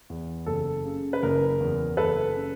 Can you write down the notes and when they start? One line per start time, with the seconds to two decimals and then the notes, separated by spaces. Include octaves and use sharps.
0.10 E2
0.46 F#1 A4
0.85 C#3
1.13 B4
1.23 F#1 A#4
1.60 E2
1.97 F#1 A4 B4
2.36 C#3